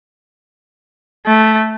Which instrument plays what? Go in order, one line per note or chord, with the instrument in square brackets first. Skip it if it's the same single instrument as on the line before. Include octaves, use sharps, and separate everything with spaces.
[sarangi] A3